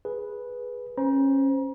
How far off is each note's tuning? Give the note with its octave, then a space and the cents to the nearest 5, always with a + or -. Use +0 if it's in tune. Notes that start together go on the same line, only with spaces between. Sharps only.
G#4 +0 B4 -10
C#4 -25 C5 -10 A#5 +35